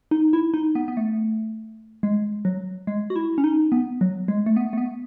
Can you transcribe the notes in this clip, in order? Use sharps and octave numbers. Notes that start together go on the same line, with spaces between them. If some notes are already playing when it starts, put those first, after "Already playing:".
D#4
E4
D#4
B3
B3
A3
G#3
F#3
G#3
F#4
E4
C#4
D#4
B3
F#3
G#3
A3
B3
A3
B3